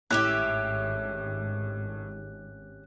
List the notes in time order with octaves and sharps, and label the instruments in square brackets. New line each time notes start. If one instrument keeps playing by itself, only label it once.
[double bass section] G#1 [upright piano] A2 [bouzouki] C#4 G4 E5 [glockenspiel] F#6